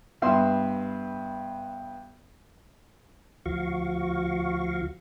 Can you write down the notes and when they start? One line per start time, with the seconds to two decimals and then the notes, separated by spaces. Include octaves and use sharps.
0.22 G2 B3 E5 C6
3.46 D2 F3 F#4 F5 C#6